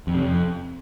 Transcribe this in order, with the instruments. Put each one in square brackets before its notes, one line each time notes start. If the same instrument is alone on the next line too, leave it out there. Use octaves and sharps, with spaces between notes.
[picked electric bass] F2
C3
F2